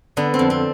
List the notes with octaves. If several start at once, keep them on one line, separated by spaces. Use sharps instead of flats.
D3 B3
C4
F2
C4